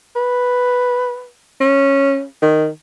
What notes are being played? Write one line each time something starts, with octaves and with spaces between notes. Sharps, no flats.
B4
C#4
D#3